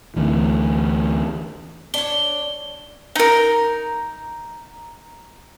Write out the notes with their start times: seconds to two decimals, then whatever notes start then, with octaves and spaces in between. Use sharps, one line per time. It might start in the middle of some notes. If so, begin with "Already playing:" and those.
0.16 D2 E3
1.94 D4 C#5 G7
3.15 D#4 A#4